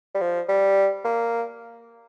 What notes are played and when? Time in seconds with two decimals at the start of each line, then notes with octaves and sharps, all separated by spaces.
0.15 G3
0.21 F3
0.48 G3
1.05 A#3